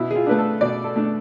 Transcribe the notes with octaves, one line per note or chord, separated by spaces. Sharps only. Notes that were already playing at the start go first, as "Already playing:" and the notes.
Already playing: B2 E4
G#4
F4
A3 D4 B4
A4
B2 D5
A4
A3 D4